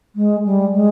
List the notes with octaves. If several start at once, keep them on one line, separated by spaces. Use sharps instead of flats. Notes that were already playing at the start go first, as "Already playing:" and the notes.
G#3
G3
G#3